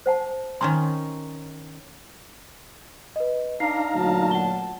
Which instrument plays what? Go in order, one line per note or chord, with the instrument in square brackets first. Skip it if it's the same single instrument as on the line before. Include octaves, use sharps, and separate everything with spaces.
[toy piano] C5 F#5 A5
[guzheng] D#3 C#4 D#4 [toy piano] G#5 C6
[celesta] B4 D#5
[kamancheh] D4 [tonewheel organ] D#4 F5 A#5 [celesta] C7
[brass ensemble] D2 A#2 F#3 [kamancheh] A5
[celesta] F#5 G7